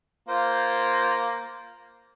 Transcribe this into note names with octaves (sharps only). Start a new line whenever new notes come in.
A#3 F4 C5